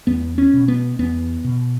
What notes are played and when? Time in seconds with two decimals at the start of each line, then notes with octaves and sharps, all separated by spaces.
0.07 E2 B3
0.38 C#4
0.54 B2
0.68 B3
0.99 E2 B3
1.44 B2